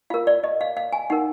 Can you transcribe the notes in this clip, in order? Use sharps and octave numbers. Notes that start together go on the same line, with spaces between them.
F4 A#4 F5
D5
D#5
F5
F5
G#5
D#4 A#4 F#5